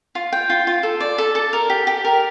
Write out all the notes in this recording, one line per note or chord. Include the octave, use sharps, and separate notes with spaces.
F4
G5
F4
F4
A4
D5
A4
A4
A#4
G4
G4
A#4